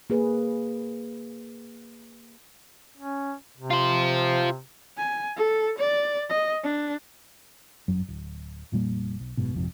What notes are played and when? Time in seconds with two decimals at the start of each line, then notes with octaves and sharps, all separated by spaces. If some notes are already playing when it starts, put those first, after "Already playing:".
0.10 A#3 G#4 B4
2.97 C#4
3.57 C3
3.71 F4 C5
4.97 G#5
5.37 A4
5.79 D5
6.30 D#5
6.63 D4
7.88 G1 F#2 F#3
8.08 D1
8.72 F1 A#2 G3 A#3
9.20 B1
9.37 F#1 G#2 B2
9.54 G#1 F2 C3